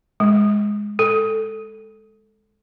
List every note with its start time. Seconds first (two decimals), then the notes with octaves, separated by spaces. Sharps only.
0.20 G#3
0.99 A4